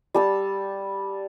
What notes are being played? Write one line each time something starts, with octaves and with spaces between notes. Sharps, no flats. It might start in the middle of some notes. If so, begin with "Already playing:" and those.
G3 A5 E6